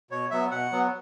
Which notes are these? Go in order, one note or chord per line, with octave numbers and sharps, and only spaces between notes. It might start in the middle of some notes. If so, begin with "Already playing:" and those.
B2 C#5
F#3 B3 E5
B2 F#5
F#3 B3